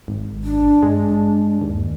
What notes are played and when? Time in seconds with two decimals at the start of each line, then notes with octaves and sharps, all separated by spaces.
0.08 G#1
0.43 D4
0.83 G2 G#3
1.61 D#2